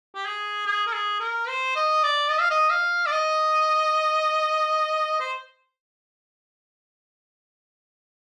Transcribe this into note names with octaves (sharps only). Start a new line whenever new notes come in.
G4
G#4
G#4
A#4
G#4
A#4
C5
D#5
D5
D#5
F5
D#5
F5
D5
D#5
C5